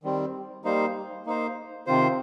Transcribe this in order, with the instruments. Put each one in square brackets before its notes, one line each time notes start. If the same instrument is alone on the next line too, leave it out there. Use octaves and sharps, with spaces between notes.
[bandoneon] D#3 G3 C4
G3 A#3 D#4 C5
A#3 D#4 C5
C3 D#3 C4 F4 C5